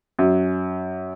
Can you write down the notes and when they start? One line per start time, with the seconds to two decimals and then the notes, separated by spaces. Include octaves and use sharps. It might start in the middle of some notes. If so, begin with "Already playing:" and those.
0.19 F#2